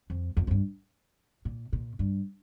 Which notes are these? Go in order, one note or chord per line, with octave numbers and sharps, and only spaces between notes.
F2
F2
F2
G2
A#2
A#2
G2